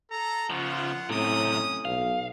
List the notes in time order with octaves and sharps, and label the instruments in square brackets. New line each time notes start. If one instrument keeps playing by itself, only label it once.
[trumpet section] A4 A#5
[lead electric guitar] C#3 F3 [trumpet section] F4 F#5
[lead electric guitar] F#2 C3 [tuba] A2 [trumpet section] C#4 D#6
[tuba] B1 [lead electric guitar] F5